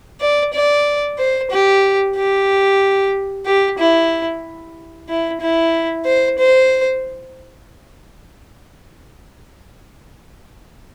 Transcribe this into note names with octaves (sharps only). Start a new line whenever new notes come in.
D5
D5
C5
G4
G4
G4
E4
E4
E4
C5
C5